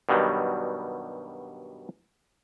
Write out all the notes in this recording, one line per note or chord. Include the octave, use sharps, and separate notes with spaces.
G2 B2 D#3 F#3 G3